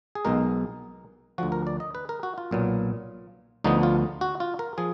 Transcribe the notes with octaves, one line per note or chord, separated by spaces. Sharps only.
G#4
B1 B2 G#3 D#4 A#4
D2 D3 F3 F#4
A#4
D5
D#5
B4
A#4
F#4
F4
B1 A#2 F#3 B3
D2 D3 F3 B3 D#4
F4
F#4
F4
A#4
F3 G#4